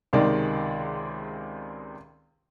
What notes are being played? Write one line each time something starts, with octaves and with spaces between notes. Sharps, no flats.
C#2 C3 D#3 G#3 D5